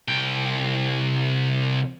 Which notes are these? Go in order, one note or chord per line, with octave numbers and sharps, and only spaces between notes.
C2 G5